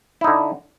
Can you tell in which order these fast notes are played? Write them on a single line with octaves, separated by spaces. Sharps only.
E4 D#4 D3